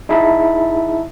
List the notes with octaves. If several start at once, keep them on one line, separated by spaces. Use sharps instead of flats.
D#4 E4 G#4 E5 A5